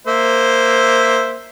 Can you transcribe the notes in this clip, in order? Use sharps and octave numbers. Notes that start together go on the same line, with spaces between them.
A#3 C5 E5